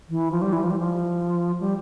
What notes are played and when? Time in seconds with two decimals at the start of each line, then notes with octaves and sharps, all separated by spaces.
0.09 E3
0.31 F3
0.42 G3
0.53 E3
0.63 F3
0.71 G3
0.79 F3
1.60 G3